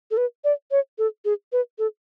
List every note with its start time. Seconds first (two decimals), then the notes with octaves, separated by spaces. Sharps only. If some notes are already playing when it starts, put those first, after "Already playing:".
0.11 A4
0.17 B4
0.44 D5
0.71 C#5
0.98 A4
1.25 G#4
1.52 B4
1.79 A4